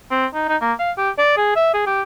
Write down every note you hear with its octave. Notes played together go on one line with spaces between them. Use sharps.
C4
D#4
D#4
A#3
F5
G4
D5
G#4
E5
G#4
G4